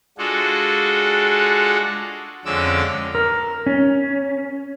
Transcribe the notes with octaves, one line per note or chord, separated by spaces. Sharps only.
G#3 D4 F4 F#4 G#4 A4
F2 D3 G#3 C#4 D6 E6
A#4
C#4